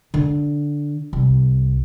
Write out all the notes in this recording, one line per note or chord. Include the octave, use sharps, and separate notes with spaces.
D3
C2